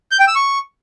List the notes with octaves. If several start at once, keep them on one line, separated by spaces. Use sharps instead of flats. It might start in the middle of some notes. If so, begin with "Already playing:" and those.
G6
G5
E6
C#6